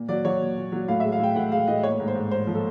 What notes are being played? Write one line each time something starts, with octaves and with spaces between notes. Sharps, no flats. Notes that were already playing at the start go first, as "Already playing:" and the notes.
Already playing: A#2
F#3 D5
F#3 C#5
A#2
A#2
F#3
A2 F5
E5
G#3
F5
A2 G5
A2 F#5
G#3 F5
A2 D#5
A#3 C#5
G#2
C5
G#2
A#3 C5
F3
A4